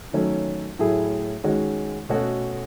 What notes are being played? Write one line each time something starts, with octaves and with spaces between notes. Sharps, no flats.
D#3 F#3 A3 C#4
A2 F#3 A3 E4 G#4
D#3 G#3 C#4 F#4
B2 A3 C#4 F#4 A4